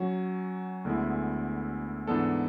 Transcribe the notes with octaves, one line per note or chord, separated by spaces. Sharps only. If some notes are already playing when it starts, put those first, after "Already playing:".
Already playing: F#3 C#4 F#4
D2 D3 G#3 B3 E4
G#2 E3 B3 D4 A4